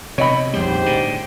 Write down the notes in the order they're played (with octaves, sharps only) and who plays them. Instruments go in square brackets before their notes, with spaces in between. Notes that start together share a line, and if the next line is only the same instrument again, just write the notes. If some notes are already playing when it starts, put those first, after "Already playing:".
[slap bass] C3 [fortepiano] C#5 D#5 B5
[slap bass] A#1 F2 G3 [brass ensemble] G#2 G4 C5
[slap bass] A2 D3